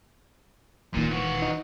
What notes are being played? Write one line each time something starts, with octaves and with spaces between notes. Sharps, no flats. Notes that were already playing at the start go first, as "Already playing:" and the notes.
D#1 A#2 D#3
E3 F#4
D#4